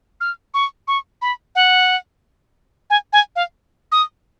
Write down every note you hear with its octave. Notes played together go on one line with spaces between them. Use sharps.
F6
C#6
C#6
B5
F#5
G#5
G#5
F5
D#6